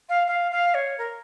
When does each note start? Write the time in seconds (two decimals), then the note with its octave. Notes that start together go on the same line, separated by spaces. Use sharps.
0.09 F5
0.27 F5
0.51 F5
0.74 C#5
0.98 A#4